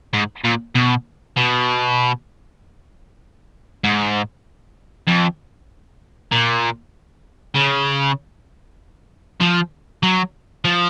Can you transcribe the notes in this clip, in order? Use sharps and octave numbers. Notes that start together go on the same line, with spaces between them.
G#2
A#2
B2
B2
G#2
F2
A#2
C#3
F3
F#3
F3